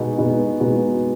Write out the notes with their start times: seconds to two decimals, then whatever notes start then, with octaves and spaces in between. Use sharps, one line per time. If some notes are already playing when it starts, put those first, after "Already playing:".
Already playing: B2 G#3 B3 D#4 F#4
0.18 B2 G#3 B3 D#4 F#4
0.60 B2 G#3 B3 D#4 F#4